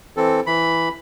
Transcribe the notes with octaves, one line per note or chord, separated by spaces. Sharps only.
E3 C4 A4
E3 B5